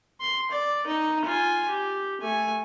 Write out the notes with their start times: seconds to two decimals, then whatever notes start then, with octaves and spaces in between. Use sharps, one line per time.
0.21 C6
0.51 D5
0.87 D#4
1.25 F4 G#5
1.68 G4
2.21 A3 G#5